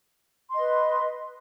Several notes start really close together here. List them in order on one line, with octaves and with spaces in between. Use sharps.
C6 D#5 B4